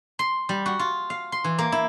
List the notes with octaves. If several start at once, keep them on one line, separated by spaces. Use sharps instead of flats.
C6
G3
F#4
F4
F5
C6
E3
A#3
E4